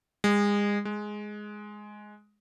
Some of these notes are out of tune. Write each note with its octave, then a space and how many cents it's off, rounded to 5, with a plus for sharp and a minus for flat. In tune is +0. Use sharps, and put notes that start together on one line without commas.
G#3 -30
G#3 +5